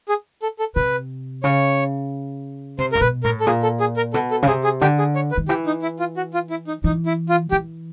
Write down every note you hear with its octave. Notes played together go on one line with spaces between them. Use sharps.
G#4
A4
A4
C3 B4
C#3 C#5
C3 C5
A#2 A#4
B2 B4
A2 A#4
A4
A#2 G#4
A4
G#4
A#4
B2 A4
A4
C#3
C3 G#4
G#4
D3 G4
G#4
C#5
B4
D#3
E3 G4
D#4
E4
F4
F#4
F4
E4
D#4
E3 D#4
E4
F4
E3 G4